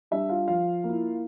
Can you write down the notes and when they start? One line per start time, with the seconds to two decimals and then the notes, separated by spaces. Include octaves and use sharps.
0.11 G3 D4 E5
0.29 F4 F5
0.47 F3 F4 F5
0.84 A#3 E4